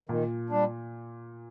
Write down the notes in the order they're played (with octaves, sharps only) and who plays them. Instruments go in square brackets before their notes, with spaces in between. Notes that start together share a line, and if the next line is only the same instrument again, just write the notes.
[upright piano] A#2 [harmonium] D#3
[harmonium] G3 D4